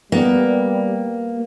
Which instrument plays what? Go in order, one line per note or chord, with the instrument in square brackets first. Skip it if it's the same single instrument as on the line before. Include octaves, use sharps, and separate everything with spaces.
[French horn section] G3 [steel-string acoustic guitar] A#3 [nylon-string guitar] B3